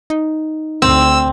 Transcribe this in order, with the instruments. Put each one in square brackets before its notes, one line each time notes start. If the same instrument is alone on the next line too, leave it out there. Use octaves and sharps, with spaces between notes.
[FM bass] D#4
[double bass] D2 [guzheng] C4 [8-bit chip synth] E6